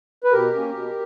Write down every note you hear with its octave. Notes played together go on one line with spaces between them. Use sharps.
B4
B2 G4 A#4
A#3 C#4
B2